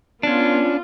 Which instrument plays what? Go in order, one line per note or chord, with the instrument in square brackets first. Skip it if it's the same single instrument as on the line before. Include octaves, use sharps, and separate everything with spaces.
[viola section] B3 F4 [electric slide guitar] C#4 D4